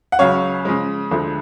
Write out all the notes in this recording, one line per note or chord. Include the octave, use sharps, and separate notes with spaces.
F#5
C#2 C#3 F#3 C#4 C#5 F5
C#3 F3 G#3
D2 D3 F3 G#3